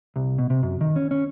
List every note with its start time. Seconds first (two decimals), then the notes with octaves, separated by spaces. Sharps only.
0.16 C2
0.38 B2
0.50 C3
0.63 F#2
0.81 D#3
0.96 C#4
1.11 C#4